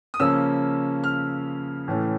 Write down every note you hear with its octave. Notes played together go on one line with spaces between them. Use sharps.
D#6
C#3 F3 A#3 C#4 E6
F6
A2 E3 A3 C#4